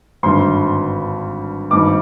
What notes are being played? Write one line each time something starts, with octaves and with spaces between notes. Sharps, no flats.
G#1 G2 D3 C6
G#1 G2 D#3 D6